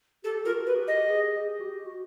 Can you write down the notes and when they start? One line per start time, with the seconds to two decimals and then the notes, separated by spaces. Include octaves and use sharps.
0.24 G4 A4
0.45 F4 A#4
0.52 F#4
0.66 B4
0.76 G#4
0.80 G4
0.88 D#5
1.09 G#4
1.37 G4
1.60 F#4
1.65 G4
1.86 F#4